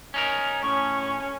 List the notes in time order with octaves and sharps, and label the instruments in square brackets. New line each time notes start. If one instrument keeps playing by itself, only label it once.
[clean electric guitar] C#4 D#4 A#4
[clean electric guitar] A2 [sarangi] C#4 [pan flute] C#6